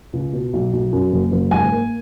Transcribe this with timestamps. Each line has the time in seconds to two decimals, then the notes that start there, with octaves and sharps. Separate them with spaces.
0.13 C#2
0.33 B2
0.53 B1
0.73 B1
0.92 F#2
1.12 F#1
1.32 F#1
1.51 G#2 G#5
1.71 A#3